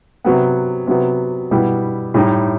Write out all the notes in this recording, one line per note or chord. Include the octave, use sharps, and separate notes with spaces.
C3 F#3 B3
C3 F#3 B3
B2 G3 B3 E4
A2 G3 D#4